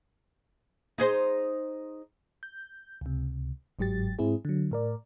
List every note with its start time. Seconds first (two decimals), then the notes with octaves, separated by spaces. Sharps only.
0.98 D#4 G#4 C5
2.43 G6
3.01 C#2 C3
3.79 G1 G#2 F#3 G4 A6
4.19 G#2 C4 E4 G#4
4.45 D3 F#3
4.71 A2 A#4 D5